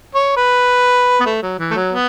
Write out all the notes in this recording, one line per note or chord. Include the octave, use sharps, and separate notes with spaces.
C#5
B4
B3
A3
F#3
E3
A3
F#3
B3